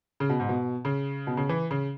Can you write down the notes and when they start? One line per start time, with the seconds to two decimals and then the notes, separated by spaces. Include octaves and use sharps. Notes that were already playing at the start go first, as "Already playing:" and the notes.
0.20 C#3
0.29 B2
0.40 G#2
0.49 B2
0.85 C#3
1.27 B2
1.37 C#3
1.49 E3
1.71 C#3